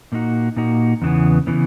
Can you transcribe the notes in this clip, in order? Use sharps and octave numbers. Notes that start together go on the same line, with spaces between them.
A#2 A#3 D#4 F#4
A#2 A#3 D#4 F#4
E2 C#3 E3 B3
C#3 E3 B3